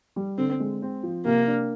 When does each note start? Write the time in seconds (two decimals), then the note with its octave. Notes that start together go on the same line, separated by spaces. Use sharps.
0.16 G3
0.38 D3 C4
0.60 G#3
0.82 C4
1.03 F3
1.25 C3 A#3
1.48 D4